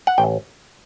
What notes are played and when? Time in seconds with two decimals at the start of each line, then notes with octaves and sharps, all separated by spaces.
0.07 F#5
0.18 A1 G5